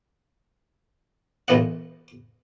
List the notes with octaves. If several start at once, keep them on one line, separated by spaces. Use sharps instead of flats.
B1 A#2 E3 D#5 F#5